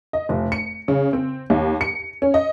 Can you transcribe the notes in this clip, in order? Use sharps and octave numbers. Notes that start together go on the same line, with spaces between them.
D#5
F1
C#7
C#3
C4
D#2
C#7
C#4
D#5